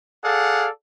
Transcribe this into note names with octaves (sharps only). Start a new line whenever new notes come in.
G#4 A4 D5 F5 F#5